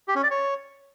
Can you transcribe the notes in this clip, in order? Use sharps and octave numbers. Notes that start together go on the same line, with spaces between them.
G4
C#4
D5
C#5